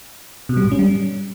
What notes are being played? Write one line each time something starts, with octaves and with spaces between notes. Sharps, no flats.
B2
G3
G#2
C#4
G3